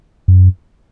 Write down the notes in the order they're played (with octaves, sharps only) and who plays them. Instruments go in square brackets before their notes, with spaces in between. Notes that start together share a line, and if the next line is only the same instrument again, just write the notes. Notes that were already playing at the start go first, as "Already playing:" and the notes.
[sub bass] F#2